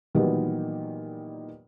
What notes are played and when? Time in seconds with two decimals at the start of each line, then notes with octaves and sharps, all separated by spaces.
0.15 A#2 D#3 E3 F#3 G3 B3